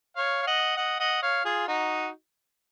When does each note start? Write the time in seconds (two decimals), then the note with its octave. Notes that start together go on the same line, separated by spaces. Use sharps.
0.16 C#5 F5
0.42 F5
0.47 D#5 F#5
0.77 D#5 F#5
1.00 D#5 F#5
1.22 C#5 F5
1.45 F4 G#4
1.68 D#4 F#4